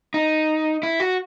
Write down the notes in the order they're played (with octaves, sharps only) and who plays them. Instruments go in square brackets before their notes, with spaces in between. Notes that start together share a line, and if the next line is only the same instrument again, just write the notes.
[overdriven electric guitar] D#4
E4
F#4